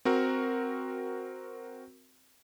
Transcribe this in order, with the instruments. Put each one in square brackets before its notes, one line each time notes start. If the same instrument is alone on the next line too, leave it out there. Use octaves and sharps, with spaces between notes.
[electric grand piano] C4 F#4 A#4